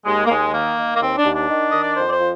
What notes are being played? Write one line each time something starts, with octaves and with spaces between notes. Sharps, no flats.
D#2 G#3
A#3
D#2 G#3
D#3 A#3
D#3
A#3
D#2 C4
D4
D#2
D4
D#3
D#3 D#5
D5
F2 C5
D5
C5
F3